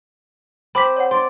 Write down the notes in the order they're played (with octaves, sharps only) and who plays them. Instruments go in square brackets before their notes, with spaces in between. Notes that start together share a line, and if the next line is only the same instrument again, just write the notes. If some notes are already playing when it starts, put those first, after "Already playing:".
[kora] C4 [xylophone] B5 D6 B6
[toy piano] C#5 F#5
[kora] D5 [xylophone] C6